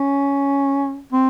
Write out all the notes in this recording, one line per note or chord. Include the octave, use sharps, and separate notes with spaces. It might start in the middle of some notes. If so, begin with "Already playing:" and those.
Already playing: C#4
C4